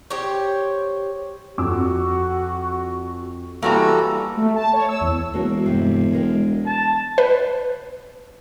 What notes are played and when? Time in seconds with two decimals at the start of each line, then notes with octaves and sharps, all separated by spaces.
0.10 G4 C5 C#5
1.58 F2 F#4 D6 E6
3.62 E3 G3 A#3 F#4 A4 A#5
4.37 A3
4.56 A5
4.73 C#5
4.89 E6
5.01 E2
5.33 E1 A#3 F#4 A#4
5.64 G2 C3 F5
6.12 G#3 A#4 G5
6.66 A5
7.18 B4